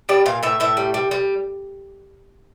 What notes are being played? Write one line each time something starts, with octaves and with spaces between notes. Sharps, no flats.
G3 D5
A#2 F5
A2 E5
A2 E5
G3
G3
G3